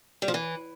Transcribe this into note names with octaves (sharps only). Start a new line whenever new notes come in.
G3
F3
E3